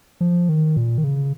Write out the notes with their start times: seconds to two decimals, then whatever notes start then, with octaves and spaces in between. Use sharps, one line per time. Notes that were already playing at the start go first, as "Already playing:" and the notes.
0.21 F3
0.49 D#3
0.77 A#2
0.98 D#3
1.04 C#3